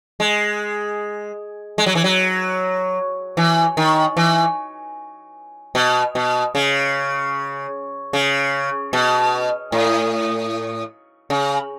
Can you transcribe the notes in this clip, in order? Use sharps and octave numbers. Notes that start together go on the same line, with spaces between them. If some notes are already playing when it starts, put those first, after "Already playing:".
G#3
G#3
F#3
E3
F#3
E3
D#3
E3
B2
B2
C#3
C#3
B2
A2
C#3